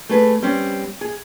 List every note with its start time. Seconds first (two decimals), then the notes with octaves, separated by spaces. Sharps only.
0.09 A3 G#4 B4
0.43 G3 C4 C#4
1.01 G#4